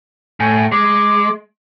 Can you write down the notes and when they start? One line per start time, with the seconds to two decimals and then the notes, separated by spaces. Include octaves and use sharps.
0.40 A2 G#5
0.72 G#3 D6